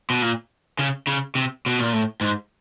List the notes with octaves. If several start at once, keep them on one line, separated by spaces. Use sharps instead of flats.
B2
A#2
C#3
C#3
C3
B2
A#2
A2
G#2